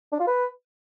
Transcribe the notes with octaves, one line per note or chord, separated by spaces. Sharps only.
D4
F4
B4